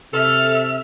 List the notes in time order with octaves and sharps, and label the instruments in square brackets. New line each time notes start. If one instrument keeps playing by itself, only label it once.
[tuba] C3 [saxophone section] A4 [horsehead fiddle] E5 [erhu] F6